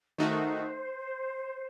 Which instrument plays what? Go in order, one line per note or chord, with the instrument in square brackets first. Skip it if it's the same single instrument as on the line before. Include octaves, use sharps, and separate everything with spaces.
[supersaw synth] D#3 A3 D#4 F#4 [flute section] C5